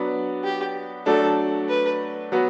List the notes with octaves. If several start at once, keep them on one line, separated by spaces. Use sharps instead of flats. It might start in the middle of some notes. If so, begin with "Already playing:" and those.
Already playing: F#3 B3 D4
G4
F#3 A3 D4 A4
B4
F#3 B3 F#4